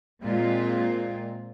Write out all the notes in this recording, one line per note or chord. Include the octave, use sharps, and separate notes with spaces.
A#2 G#3 C4 F4